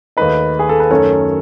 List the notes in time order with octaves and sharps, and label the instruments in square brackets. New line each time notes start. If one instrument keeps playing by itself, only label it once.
[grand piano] D#2 D#3 A3 B4 D#5
G#4
A4
B4
F#2 D#3 A3 C#4 A4 C#5